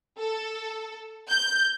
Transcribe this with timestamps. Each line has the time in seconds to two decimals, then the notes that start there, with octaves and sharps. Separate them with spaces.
0.19 A4
1.30 G6